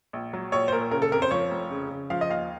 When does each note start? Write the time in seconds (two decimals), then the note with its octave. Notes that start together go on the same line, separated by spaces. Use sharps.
0.13 A#1
0.33 F#3
0.52 A#1 C#5
0.68 C5
0.72 A#2 A#4
0.91 C#3 A#4
1.02 A4
1.12 F2 A#4
1.22 C5
1.31 F3 C#5
1.51 F1
1.71 C#3
1.90 C#3
2.10 F3 F5
2.21 D#5
2.29 D#2 F5